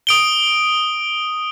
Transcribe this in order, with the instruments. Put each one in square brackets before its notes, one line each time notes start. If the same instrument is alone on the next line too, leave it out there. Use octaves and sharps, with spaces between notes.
[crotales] D#6 D7 G7